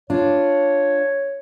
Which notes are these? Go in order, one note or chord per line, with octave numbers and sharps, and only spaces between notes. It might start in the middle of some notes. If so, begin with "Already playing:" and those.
D4 F4 C#5